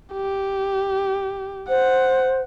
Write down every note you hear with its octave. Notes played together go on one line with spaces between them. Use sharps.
G4
C5 F#5